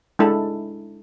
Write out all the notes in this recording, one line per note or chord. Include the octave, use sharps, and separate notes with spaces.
G#3 D4 E4 A4